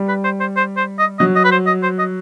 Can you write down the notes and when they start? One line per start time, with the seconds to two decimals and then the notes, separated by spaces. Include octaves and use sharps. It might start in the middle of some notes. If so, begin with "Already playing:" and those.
Already playing: G3
0.09 B4
0.24 C5
0.40 C5
0.57 C5
0.77 C5
0.99 D#5
1.19 F#3 D#5
1.36 D#5
1.45 B4
1.52 C5
1.67 D#5
1.83 C5
1.99 D#5